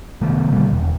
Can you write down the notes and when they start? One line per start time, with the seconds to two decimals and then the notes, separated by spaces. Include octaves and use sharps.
0.21 C3 D#3 A3 B3
0.52 B2 D3 G3 A#3
0.73 E1